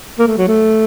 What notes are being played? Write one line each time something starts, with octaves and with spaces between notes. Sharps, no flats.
A#3
A3
F#3
A3